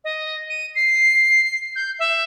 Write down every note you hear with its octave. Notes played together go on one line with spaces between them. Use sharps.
D#5
D#7
C7
G6
E5